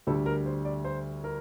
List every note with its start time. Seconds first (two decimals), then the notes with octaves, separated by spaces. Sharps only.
0.07 D2 D3 G3 A4
0.26 A#4
0.46 C5
0.65 D5
0.85 C5
1.24 A#4